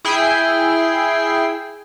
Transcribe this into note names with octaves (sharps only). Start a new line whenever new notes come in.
E4 G#4 G5 C7